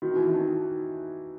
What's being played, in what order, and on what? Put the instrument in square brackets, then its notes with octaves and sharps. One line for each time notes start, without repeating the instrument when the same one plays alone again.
[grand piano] D#3 [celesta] F#4
[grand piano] E3
[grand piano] D#3 [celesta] D#4